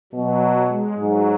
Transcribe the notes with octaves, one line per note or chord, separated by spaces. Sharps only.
B2 F#3
G#3
G#2 F#3